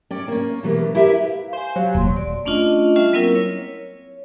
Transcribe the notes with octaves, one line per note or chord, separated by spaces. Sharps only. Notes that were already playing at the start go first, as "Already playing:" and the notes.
C#4 D5 G5
A#3 C#4
B2 E3 G3 G#3 A#3
E4 G4 A#4 B4 E5
F5
C5 F5 G#5
F#3 G4
D#1 A#3 C6
D5
A3 C#4 D4 F4 D#5
G3 C#4 F4 E5
F#3 A#3 C4 E4 A#4
C#5